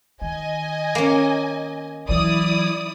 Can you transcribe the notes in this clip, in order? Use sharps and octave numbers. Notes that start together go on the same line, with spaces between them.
D#3 D#5 G#5
A#3 C#4
E3 F#3 E4 D5 D#6